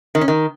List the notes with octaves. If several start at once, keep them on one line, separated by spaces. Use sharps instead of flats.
D#3
C#4
D#3